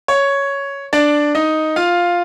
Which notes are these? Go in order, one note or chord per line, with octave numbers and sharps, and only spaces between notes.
C#5
D4 D5
D#4 D#5
F4 F5